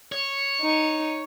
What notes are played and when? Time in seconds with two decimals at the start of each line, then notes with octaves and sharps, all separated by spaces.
0.12 C#5
0.61 D#4